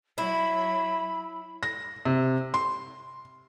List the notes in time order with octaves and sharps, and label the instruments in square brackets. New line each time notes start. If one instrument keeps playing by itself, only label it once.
[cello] F#3 E5 [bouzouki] E4 [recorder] B5
[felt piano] A#6
C3
C6